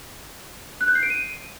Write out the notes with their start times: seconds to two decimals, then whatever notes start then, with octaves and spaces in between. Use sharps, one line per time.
0.81 F#6
0.88 G6
0.95 C7
1.03 D7
1.10 D#7